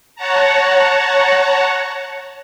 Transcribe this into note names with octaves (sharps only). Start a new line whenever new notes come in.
C#5 F#5 A5 A#5